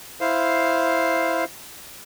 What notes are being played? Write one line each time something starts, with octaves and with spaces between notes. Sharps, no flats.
E4 C5 F5